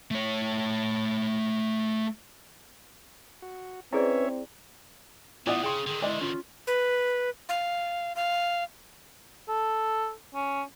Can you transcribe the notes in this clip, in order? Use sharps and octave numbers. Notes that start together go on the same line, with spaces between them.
A3 C#5
F#4
C4 C#4 E4 G#4 B4 C#5 D5 E5
A2 E3 B3 E4 F4 D5
C#3 G#4 G5 C6
D3 D#3 G#4
G#3 E4 D5
C#4 F4
B4
F5
F5
A4
C#4